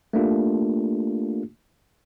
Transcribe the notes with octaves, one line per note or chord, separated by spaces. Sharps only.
A3 A#3 D4 F4 G4